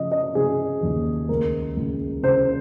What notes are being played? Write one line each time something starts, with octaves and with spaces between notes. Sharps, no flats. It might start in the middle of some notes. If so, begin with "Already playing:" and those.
Already playing: C#3 F3 D#5
D#5
C#3 G#4
D#2
C#2 A#4
C#2
C#3 C5